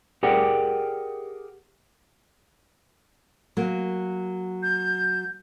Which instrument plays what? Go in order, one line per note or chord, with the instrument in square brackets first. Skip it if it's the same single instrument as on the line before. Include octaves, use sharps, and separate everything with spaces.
[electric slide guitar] G4 G#4 A#4 D5 F#5 G5
[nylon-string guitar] F#3 A#3
[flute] G6